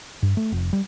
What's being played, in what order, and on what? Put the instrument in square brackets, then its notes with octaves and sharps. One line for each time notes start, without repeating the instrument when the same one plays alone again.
[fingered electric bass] G2
A3
F1
G3